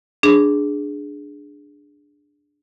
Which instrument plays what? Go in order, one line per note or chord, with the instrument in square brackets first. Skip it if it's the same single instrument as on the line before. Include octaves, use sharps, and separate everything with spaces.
[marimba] D4 G#4